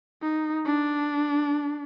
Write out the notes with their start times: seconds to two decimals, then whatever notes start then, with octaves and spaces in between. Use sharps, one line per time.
0.22 D#4
0.66 D4